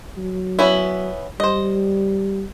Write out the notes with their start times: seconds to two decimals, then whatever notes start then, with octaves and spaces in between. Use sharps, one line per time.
0.17 F#3
0.59 B3 C#4 E4
1.40 G3 C5 D#5